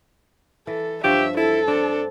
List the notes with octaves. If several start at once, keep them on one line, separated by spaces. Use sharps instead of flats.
E3 A4
G2 F3 G4 C#5 E5
E4 A4
C4 D4